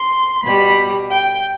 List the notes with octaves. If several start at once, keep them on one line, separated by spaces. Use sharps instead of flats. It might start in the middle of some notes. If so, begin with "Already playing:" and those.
Already playing: C6
B2 G3 B5
G5